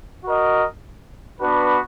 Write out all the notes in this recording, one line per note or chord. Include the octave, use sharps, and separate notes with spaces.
F#4 A#4 D#5
B3 D4 F#4 B4